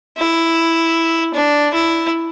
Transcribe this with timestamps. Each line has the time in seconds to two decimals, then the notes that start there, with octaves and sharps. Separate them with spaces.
0.18 E4
1.34 D4
1.73 E4